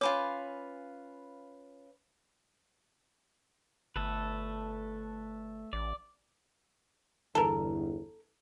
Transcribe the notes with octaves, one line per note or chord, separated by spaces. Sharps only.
C#4 F4 B4 C#5 F5 G#5 B5 D6
G1 A3 A4 B4
A1 D5
G1 E2 A4 A#4